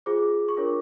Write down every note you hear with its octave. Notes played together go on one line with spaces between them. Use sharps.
F4 G#4 C5 D6
C#6
D4 F4 A#4 C#5 D6